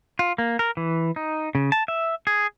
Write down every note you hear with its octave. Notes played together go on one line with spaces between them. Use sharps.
F4
A#3
A#4
E3
D#4
C#3
A5
E5
G#4